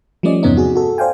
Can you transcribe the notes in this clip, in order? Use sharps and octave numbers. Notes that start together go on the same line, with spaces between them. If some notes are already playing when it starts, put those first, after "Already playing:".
F3 G3 A3 C#4 D5 D#5
E2 G2 C3 B3 C#4 D#4
F#4 G#4
F#4 A4
C5 D5 F5 G5 G#5